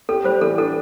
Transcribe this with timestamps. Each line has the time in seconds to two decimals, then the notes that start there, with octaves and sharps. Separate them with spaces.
0.09 G4 A4
0.24 G3 C5
0.41 E3 A4
0.58 D4 A4